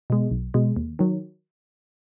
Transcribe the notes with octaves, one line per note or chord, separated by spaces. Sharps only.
B2 G#3
B1
B2 G#3
D#2
D#3 F#3